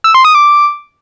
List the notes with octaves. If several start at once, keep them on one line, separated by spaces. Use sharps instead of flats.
E6
C6
D#6
D6